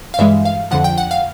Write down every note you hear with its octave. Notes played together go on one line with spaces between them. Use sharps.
F5
G2 E3 G#3 E5
F5
F2 D3 F3 F#5
G5
F#5
F5